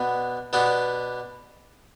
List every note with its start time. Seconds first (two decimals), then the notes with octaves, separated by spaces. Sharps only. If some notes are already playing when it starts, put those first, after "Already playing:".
Already playing: B2 B3 D4
0.53 B2 B3 D4 G4